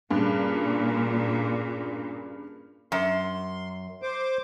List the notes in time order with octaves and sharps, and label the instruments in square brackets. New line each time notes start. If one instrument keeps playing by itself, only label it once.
[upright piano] G2 C#3 [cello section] A#2
[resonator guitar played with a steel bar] F#2 [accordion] C6
[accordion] C5 D6